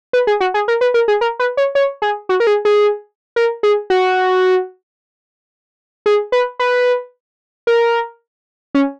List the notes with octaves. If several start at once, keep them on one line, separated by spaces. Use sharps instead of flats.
B4
G#4
F#4
G#4
A#4
B4
A#4
G#4
A#4
B4
C#5
C#5
G#4
F#4
A#4
G#4
G#4
A#4
G#4
F#4
G#4
B4
B4
A#4
C#4